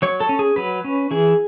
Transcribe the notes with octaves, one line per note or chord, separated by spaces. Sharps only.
F#3 C#5
A4
C#4
G#4
F#3 B4
C#4
E3 G#4